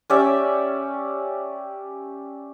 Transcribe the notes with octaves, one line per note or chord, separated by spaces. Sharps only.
C#4 G4 D5 E5